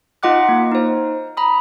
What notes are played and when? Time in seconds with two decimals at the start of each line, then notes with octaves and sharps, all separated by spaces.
0.23 D#4 F4 D#5 F#5 D6 F#6
0.49 A#3
0.72 D#4 C5
1.37 A#5 B5 D#6